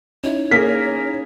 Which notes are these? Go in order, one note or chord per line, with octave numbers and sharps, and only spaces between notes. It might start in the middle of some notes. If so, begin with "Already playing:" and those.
C#4 D#4 E4 C#5
A#3 G#4 A#4 B6